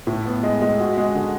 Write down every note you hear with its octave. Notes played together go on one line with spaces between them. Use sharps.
A2
B3
G#3
G#3
F#4
G#3
D3